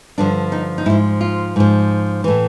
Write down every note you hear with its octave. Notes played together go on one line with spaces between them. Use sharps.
G2 D3 F3 D4
D#4
D#4
G#2 F3 E4
F4
G#2 F3
A2 E3